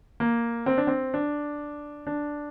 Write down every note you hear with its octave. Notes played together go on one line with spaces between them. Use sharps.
A#3
C4
D4
C4
D4
D4